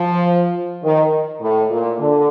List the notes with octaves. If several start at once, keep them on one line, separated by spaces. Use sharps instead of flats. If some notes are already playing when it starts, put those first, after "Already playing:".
Already playing: F3
D#3
A2
A#2
D3